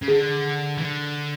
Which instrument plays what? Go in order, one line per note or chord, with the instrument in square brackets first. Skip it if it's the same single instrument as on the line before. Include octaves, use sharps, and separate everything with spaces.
[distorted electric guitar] C#3
[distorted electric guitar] D3 [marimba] G#4
[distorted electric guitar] E3
D3